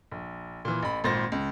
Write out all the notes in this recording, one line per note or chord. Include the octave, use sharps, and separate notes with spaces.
A#1
A#2 E3
A1 B5
G#1 A#2 C5 A6 A#6
C#2